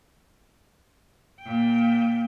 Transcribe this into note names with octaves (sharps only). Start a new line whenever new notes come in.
A#2 G5